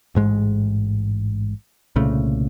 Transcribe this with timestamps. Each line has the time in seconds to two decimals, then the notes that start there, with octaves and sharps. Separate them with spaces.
0.15 A1 G#2 G#3
1.96 C2 A#2 C#3 A3